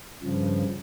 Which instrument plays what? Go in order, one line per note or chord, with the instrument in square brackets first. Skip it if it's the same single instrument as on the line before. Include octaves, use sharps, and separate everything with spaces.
[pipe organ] G2 C#3 F3